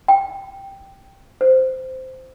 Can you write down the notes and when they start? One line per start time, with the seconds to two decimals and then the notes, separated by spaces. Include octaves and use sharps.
0.08 G5
1.41 C5